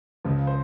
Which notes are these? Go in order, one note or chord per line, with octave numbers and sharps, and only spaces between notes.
C#2 C#3 F3
C5